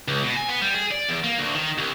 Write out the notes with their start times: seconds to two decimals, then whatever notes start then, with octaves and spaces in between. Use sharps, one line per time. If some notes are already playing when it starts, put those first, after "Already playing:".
0.08 C#2
0.23 B2
0.37 G#5
0.49 B3
0.62 G3
0.74 G#4
0.91 D5
1.09 E2
1.24 A#3
1.38 D2
1.55 D#3
1.78 C2